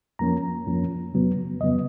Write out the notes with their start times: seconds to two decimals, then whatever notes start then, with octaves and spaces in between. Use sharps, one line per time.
0.19 F2 F3 A#3 C#4 A#5
0.67 F2 F3 A#3 C#4
1.14 F2 C#3 F#3 B3
1.60 F2 C#3 F#3 B3 D#5